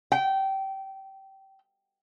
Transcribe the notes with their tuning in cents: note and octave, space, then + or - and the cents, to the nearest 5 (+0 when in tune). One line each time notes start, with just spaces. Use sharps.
G5 -20